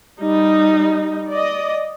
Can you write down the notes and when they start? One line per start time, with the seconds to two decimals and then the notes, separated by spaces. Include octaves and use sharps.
0.19 G3 D#4
1.31 D5 D#5